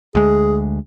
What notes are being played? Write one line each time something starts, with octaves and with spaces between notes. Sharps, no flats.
D2 G#3 G#4